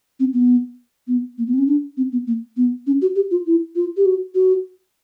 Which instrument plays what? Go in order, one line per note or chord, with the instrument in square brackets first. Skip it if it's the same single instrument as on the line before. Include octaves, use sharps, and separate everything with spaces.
[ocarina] C4
B3
B3
A#3
B3
C4
C#4
D4
C4
B3
A#3
B3
C#4
F#4
G4
F4
E4
F4
G4
F#4
F#4